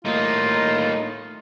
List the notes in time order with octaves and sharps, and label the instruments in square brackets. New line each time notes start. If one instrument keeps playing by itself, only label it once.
[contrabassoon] A2 [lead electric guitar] G3 A#3 [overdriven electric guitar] D#4 [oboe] F4